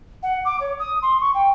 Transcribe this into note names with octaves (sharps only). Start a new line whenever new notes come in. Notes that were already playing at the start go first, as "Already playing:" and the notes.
F#5
D6
C#5
D#6
C6
C#6
G5